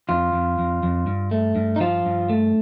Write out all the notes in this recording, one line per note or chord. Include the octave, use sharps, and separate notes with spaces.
F2 F4
F2
F2
F2
G2
A3
G2
D#4
F3 F4
G2
A3